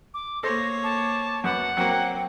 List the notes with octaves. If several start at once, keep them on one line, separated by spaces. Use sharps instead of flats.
D6
A#3 A4 C5 C#5 C6 A#6
A5 D6
F#2 B3 F#5
F#3 A#3 C4 G5